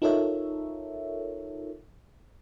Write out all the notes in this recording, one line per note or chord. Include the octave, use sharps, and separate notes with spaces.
D#4 F4 A4 A#4 C#5 E5